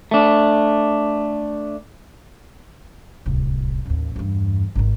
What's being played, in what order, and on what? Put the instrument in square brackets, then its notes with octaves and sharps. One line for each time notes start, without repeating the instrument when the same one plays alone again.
[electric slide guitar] A3 D4
[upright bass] D1 C2
A1 D#2
E2 G2
G#1 D#3